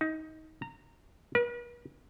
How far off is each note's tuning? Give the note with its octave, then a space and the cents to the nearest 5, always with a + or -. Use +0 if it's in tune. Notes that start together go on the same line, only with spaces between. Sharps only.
D#4 +20
A#5 -20
B4 -45